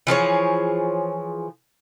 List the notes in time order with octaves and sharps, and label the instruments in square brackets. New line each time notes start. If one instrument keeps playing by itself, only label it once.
[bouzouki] E3 F3 G#4 C#5